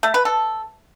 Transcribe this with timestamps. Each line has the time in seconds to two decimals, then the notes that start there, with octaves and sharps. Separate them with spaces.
0.03 A3
0.14 B4
0.25 A4